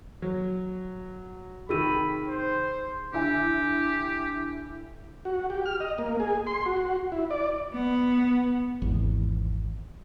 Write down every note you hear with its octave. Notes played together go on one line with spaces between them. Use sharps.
F#3
C3 D#3 G#4 B5 E6 D#7
C5
D3 E4 G4 G#5
F#4
G4
F6
D#5
A#3
G#4
C6
F#4
E4
D5
B3
G#1 E2